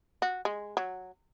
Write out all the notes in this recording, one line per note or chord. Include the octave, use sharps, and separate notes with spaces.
F#4
G#3
F#3